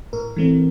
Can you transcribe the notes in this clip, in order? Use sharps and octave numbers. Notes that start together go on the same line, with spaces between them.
A2 A#4
E3 A3 C4